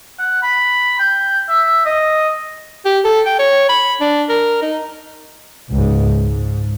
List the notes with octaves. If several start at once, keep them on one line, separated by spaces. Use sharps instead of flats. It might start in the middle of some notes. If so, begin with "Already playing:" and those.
F#5
B5
G5
E5
D#5
G4
A4
G5
C#5
B5
D4
A#4
D#4
C#2 G#2
G#2